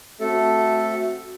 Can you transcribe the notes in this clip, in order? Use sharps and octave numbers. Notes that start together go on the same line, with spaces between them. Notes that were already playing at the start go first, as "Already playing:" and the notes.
A3 C4 F#4 A4